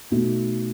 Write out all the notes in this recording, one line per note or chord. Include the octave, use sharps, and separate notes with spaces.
B2 A3 D#4 F#4